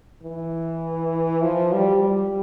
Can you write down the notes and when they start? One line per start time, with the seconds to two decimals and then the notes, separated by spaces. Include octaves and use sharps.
0.23 E3
1.43 F3
1.72 G3
2.04 G3